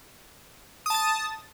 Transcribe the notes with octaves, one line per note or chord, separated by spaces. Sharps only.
A5 D#6 A6